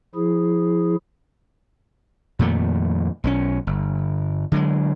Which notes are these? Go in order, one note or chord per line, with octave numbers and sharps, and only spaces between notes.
F3 E4 G#4
F2 A#2 D#3 A3
B1 F#3 C#4
G1
D3 F#3 G#3